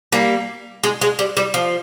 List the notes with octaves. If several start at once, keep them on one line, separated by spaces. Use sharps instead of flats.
G3 A#3
G#3
G#3
G3
G3
F3